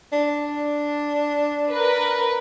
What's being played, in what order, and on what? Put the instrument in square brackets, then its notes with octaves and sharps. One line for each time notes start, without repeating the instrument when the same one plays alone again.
[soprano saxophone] D4
[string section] A#4 B4